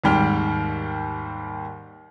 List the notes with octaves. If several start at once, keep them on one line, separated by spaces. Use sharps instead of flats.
D#2 G#2 G3 G5 F6